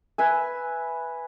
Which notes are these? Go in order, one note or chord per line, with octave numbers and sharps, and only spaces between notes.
B4 E5 G#5